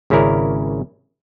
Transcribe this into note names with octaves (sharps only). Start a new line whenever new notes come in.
G#1 C#3 C#4 E4 A#4 D5